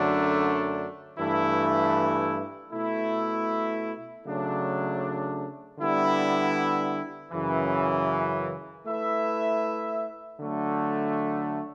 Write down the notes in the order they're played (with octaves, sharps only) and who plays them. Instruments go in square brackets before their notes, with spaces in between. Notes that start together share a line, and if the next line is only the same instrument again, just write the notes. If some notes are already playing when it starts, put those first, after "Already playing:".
Already playing: [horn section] F#2 D3 F#3 A3 D4
G2 E3 A3 E4
B2 A3 E4
C#3 F#3 A3 D4
D3 G3 B3 E4
F#2 C#3 E3
A3 E4 B4 E5
D3 F#3 A3